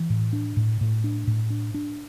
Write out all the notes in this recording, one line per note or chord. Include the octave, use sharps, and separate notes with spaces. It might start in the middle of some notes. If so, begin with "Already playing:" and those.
Already playing: E3
A2
D4
A2
A2
D4
A2
D4
D4